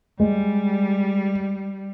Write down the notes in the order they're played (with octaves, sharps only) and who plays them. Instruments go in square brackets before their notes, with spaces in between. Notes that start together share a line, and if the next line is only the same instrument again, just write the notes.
[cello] G3 [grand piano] G#3